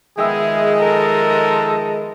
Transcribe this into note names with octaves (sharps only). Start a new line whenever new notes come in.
D#3 F3 G#3 B3 G#4 E5 G5
A4 A#4